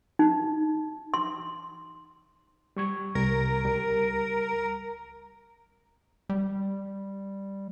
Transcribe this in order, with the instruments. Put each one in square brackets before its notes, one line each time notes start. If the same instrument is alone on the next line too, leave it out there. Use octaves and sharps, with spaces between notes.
[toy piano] D#4
C6
[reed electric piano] G3 C#6 G#6
[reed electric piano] C2 G3 [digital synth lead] A#4
[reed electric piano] C#2 G3
[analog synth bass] G3